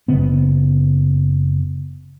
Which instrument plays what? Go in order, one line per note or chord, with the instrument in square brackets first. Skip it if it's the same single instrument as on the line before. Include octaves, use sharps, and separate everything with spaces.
[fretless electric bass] F#1 C#3 B3